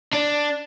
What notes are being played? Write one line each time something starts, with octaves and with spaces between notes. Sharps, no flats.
D4